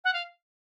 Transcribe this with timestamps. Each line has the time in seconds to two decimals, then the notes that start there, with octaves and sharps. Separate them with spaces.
0.04 F#5
0.13 F5